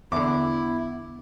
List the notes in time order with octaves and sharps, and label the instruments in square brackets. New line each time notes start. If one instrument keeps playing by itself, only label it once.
[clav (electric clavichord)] E2 D3 [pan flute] B3 [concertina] E4 [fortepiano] D6